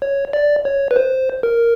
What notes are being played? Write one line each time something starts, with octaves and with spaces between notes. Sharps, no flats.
C#5
D5
C#5
B4
C5
A#4